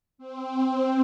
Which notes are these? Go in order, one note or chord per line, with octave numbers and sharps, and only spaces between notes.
C4